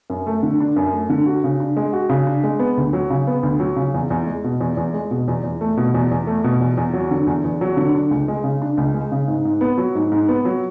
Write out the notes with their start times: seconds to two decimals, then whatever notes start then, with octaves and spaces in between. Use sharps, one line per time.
0.10 F#2
0.27 A3
0.43 D3
0.60 D4
0.76 F#2
0.93 A3
1.10 D3
1.26 F#4
1.44 C#3
1.60 D4
1.77 G#3
1.93 F#4
2.09 C#3
2.27 D4
2.44 G#3
2.59 B3
2.77 D2
2.93 F#3
3.10 C#3
3.27 B3
3.43 D2
3.60 F#3
3.76 C#3
3.94 E2
4.10 E2
4.26 G#3
4.44 B2
4.61 E2
4.77 E2
4.94 G#3
5.11 B2
5.28 E2
5.44 E2
5.61 A3
5.77 B2
5.94 E2
6.11 E2
6.27 A3
6.44 B2
6.61 E2
6.77 E2
6.94 F#3
7.11 D3
7.27 E2
7.44 E2
7.61 F#3
7.77 D3
7.95 D4
8.11 C#2
8.28 G#3
8.44 C#3
8.62 D4
8.77 C#2
8.94 G#3
9.12 C#3
9.28 G#2
9.45 G#2
9.61 B3
9.78 F#3
9.95 G#2
10.11 G#2
10.29 B3
10.45 F#3